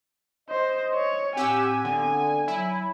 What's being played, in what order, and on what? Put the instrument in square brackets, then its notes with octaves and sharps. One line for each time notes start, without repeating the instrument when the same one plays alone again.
[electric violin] C5 [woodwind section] D#5
[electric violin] C#5
[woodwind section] A2 C4 [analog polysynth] G4 F#5 E6 [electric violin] G#5
[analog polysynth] D3 [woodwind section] B3 C4
[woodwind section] F#3 [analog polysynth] E4